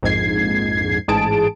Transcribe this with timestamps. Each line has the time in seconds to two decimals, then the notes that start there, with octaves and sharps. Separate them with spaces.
0.03 A#1 F2 G#2 G#6 C7
1.08 A1 G#2 G#4 A5 D7